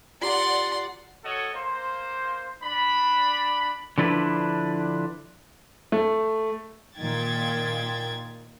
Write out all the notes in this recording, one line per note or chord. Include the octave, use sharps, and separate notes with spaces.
F4 G4 D5 F#5 A#5 C6
F#4 A4 C#5 D#5
A#3 C5
D4 B5
D3 F3 D4 E4 B4
A3
A#2 D#3 G5 G#6 A6